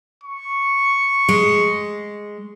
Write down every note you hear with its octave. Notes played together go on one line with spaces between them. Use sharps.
C#6
G#3